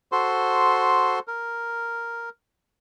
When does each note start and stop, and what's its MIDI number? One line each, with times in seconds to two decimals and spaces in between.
0.12 1.19 66
0.12 1.19 69
0.12 1.19 72
0.12 1.19 84
1.27 2.29 70